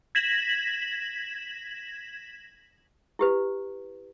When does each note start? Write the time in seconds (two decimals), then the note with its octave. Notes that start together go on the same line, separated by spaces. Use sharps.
0.15 G#6 A#6 B6 E7 F#7
3.19 E4 G4 B4